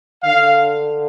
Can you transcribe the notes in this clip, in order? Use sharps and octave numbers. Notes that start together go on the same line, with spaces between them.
D3 F5